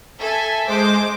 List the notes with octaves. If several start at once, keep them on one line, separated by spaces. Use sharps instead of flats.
A4 E5 G#5
G#3 C5 D6